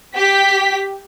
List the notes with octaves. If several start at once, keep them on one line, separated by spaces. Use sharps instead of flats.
G4 B6